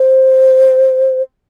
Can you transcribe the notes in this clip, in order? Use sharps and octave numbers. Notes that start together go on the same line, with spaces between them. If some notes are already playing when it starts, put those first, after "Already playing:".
Already playing: C5